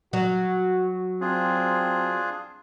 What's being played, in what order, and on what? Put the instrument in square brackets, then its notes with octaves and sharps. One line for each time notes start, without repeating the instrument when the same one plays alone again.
[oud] F#3 [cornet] F#4
[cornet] C4 [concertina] D4 F4 G#4